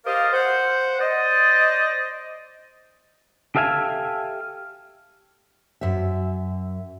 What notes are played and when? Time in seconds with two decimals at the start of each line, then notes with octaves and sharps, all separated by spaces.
0.06 G4 A#4 C5 D5 D#5 F5
0.32 C5 F#5
0.99 C5 D5 D#5
3.55 G4 A4 E5 F5 G#5
5.81 F#2 E5